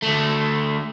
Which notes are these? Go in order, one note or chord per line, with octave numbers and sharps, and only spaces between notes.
D2 A3